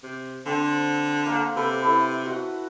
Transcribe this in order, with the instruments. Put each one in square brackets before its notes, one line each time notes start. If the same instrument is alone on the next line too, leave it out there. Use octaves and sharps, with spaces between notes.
[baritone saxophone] C3
[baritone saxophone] D3 [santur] C4
[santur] A#3 F5 F#5
[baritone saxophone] C3 [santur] A4 B4
[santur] E4 A4 B4
F#4 F#5